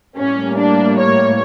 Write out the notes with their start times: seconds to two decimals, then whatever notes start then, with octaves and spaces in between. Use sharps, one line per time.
0.17 A2 G3 A#3 C#4
0.57 D4
0.98 C#5